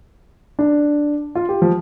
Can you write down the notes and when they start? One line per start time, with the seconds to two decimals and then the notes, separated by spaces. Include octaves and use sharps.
0.59 D4
1.35 F4
1.49 G4
1.62 F3